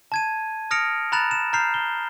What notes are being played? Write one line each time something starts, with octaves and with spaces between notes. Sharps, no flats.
A5 G#6 D#7
D#6 F6 A#6 C#7 D7 F7
A#5 B5 F#6 A6 E7 F7
E7
A#5 F6 G6 C7 F7
G7